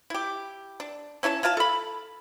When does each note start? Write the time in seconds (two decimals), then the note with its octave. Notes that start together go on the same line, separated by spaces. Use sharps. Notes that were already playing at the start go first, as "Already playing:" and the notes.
0.10 E4 G4
0.80 D4
1.23 C#4 E4 C#5 A5
1.43 E4 F4 F5 A5
1.57 A4 B5